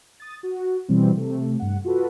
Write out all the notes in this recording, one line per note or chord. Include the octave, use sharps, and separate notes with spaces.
D#6 A6
F#4
B2 E3 G3 C4
C3 A3
G2 F#5
F4 F#4 A4 B4